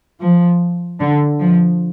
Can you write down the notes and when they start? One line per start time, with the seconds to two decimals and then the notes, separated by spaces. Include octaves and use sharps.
0.22 F3
1.00 D3
1.40 F3